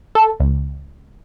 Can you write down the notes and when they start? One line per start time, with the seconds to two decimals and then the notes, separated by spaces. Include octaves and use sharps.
0.15 A4
0.40 C#2